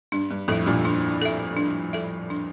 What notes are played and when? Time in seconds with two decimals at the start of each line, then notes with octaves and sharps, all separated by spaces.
0.12 G2 D4
0.31 G2
0.48 F2 A2 A4 E5
0.66 G2 A#2
0.85 D4
1.22 A4 E5
1.57 D4
1.93 A4 E5
2.30 D4